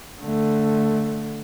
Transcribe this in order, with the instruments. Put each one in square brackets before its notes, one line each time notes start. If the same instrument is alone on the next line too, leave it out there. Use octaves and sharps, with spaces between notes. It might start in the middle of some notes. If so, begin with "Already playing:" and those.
[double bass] D3 A3